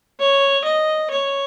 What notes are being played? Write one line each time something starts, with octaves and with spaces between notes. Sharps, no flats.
C#5
D#5
C#5